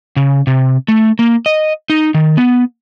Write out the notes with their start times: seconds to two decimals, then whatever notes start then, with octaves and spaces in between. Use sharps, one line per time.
0.17 C#3
0.47 C3
0.88 A3
1.19 A#3
1.46 D#5
1.90 D#4
2.14 D#3
2.37 B3